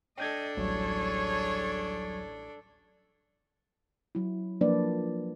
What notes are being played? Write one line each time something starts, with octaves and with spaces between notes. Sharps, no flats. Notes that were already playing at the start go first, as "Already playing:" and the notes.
D4 A4 D#5 G5 G6 G#6
A1 D2 F#3 G3 G#4 C#5
F#3 E4
F3 F#3 A#3 D4 B4 D5